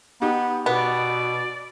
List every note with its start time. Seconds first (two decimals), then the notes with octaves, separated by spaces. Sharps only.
0.22 B3 D#4 G4
0.66 B2 B3 D5